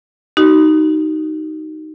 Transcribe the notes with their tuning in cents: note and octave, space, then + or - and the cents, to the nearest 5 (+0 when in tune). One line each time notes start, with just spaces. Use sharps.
D#4 +0 F#4 +45